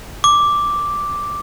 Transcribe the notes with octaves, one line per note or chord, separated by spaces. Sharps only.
D6